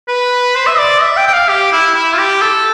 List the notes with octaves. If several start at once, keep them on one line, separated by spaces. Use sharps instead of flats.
B4
C5
E5
D5
E5
G5
G5
F5
G4
E4
E4
F4
G4
A4